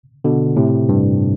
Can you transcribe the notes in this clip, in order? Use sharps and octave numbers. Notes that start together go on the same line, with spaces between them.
B2 D3
A2 C3
G2